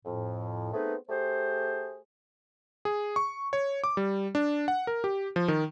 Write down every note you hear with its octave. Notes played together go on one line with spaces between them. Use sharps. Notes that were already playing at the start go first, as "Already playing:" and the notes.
F2 A2
A3 B3 C4 D#4 G#4 B4
A3 G4 G#4 C5
G#4
C#6
C#5
D6
G3
D4
F#5
A#4
G4
F3
D#3